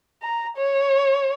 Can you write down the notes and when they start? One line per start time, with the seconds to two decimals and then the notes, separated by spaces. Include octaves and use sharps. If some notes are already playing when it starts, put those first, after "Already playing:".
0.22 A#5
0.57 C#5